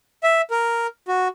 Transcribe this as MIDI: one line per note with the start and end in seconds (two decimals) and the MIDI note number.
0.23 0.42 76
0.51 0.87 70
1.08 1.28 66